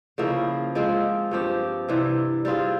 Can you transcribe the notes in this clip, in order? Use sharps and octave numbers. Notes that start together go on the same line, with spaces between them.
C#3 F3 A#3 E4
F3 G#3 C4 F4
G2 F3 C4 G4
C3 E3 G3
G3 C4 F4 G#4